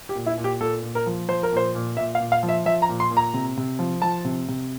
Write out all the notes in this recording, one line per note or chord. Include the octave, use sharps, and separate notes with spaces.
G4
A#2
E4
A#2
G4
A#2 A4
A#2
A#4
F3
F3 C5
A#4
A#2 C5
A#2
A#2 E5
F5
A#2
F5
F3
E5
F3 E5
A#5
A#2
C6
A#2
A#5
C3
C3
F3
F3 A5
C3
C3